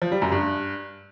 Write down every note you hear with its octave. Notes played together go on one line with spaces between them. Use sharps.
F3
G3
F#2
G2